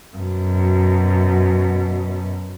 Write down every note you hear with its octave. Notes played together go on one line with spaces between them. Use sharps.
F#2 B2